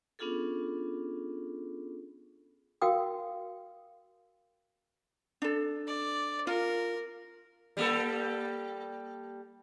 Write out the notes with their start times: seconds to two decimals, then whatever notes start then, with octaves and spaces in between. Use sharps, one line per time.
0.19 B3 C#4 D4 F4 G#4 A4
2.82 F#4 A#4 F5 G5 D#6
5.42 D4 A4
5.87 D5
6.47 F4 A#4
7.77 G3 A#3 A4